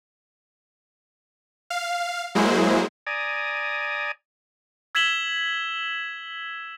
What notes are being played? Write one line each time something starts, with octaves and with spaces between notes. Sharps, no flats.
F5
F#3 G#3 A#3 E4 G#4 C5
D5 G#5 A#5 D#6
E6 G#6 B6 E7 F#7 G7